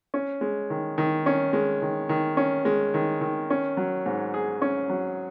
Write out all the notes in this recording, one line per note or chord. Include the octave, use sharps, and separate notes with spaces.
C#4
G#3
D#3
D#3
C#4
G#3
D#3
D#3
C#4
G#3
D#3
D#3
C#4
F#3
G#2
G#4
C#4
F#3